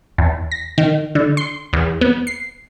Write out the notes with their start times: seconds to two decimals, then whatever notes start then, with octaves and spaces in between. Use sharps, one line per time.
0.18 E2
0.51 A#6
0.78 D#3
1.15 D3
1.37 C6
1.73 E2
2.01 B3
2.27 C7